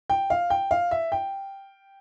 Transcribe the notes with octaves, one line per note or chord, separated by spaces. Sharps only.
G5
F5
G5
F5
E5
G5